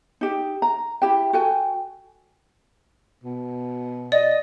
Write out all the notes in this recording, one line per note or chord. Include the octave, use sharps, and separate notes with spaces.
D#4 G4
A#5
E4 G4 G5
F#4 A4 G5 G#5
B2
D5 D#5